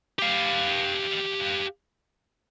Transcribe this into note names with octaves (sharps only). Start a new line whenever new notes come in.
G4 F5